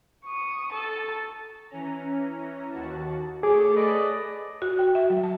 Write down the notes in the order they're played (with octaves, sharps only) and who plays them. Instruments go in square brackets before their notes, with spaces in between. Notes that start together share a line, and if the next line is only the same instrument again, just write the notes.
[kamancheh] C#6 D#6
A4 A5
[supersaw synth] E3 C#4 A#5
D#2 F#4 A5
[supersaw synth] A3 A4 C#5 [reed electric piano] G#4 [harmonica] D6
[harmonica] B4 D5 D#5
[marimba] F#4
G5
E5
F#3
A5